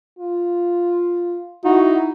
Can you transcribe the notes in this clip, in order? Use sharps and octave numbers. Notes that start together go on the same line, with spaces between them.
F4
D#4 E4 F#4